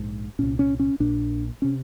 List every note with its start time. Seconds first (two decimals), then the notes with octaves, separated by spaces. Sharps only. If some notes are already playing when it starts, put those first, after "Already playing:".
Already playing: A#1 G#2
0.39 C2 A#2 C#4
0.59 C#4
0.80 C#4
1.00 A#1 A#2 D4
1.62 C3 C#4